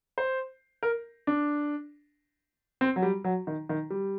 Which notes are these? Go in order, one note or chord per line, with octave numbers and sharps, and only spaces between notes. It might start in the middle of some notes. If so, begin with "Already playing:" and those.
C5
A#4
D4
C4
F#3
G3
F#3
D#3
D#3
G3